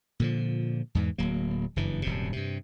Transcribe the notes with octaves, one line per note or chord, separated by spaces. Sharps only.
A#2 D3 F3
E2 G#2 E3
D1 F#3 A#3
F#1 G2 E3
D#1 F#2 C3
G2 C3